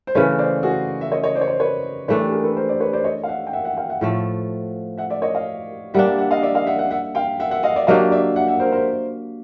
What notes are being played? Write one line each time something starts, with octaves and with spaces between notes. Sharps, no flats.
C5
C#3 E3 A3 B4 C#5
C5 D5
F#4 G#4
E5
C#5 D#5
C#5 D#5
C5 D5
C#5
C5 D5
B4 C#5
E3 A3 D4 B4 C#5
G4 A4
G#4 A#4
A4 B4
A#4 C5
C5 D5
B4 C#5
C5 D5
C#5 D#5
F5
E5 F#5
G5
E5 F#5
E5 F#5
F5 G5
E5 F#5
A2 F3 A3
E5 F#5
D5 E5
C#5 D#5
D#5 F5
G3 A#3 D4 E5 F#5
E5 F#5
E5 F#5
D#5 F5
D5 E5
D#5 F5
E5 F#5
E5 F#5
E5 F#5
F5 G5
E5 F#5
E5 F#5
D#5 F5
D5 E5
F#3 A#3 D4 G4 D#5 F5
D5 E5
E5 F#5
E5 F#5
A#4 C5
A#4 C5